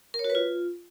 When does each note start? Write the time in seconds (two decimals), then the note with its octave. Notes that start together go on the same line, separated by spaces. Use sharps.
0.14 A#4
0.19 C#5
0.24 F#4
0.30 B4
0.35 F4